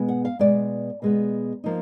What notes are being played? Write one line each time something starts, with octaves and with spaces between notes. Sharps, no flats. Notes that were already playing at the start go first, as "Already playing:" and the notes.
Already playing: B2 G#3 B3
F#5
F5
B2 G#3 B3 D5
B2 G#3 B3
F3 A#3 D#4